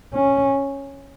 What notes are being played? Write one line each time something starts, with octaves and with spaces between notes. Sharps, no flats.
C#4